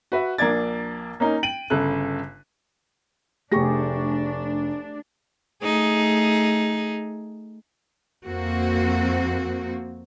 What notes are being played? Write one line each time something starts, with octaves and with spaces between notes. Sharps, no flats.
F#4 B4 E5
A#1 A#3 D4 D5 G#6 A6
A#3 C#4 D#4
G5 D7 D#7 F#7
G1 C#3 A4 F#6
F1 A3 D4 G4 G#4 C#6 A#6
A3 D#4 G#4
F2 A#3 C4 F#4